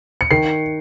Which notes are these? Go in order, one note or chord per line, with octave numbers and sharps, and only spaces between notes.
C#7
D#3 C7